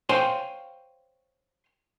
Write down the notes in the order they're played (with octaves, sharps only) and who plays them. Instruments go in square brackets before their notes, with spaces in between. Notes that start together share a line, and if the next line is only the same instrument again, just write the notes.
[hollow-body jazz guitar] C5 C#5 F5 G5 G#5 C6